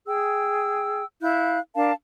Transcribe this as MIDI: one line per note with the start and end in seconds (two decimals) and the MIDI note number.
0.07 1.04 68
0.07 1.04 79
0.07 1.04 88
1.22 1.58 64
1.22 1.58 77
1.22 1.58 90
1.22 1.58 91
1.75 1.92 62
1.75 1.92 70
1.75 1.92 77
1.75 1.92 81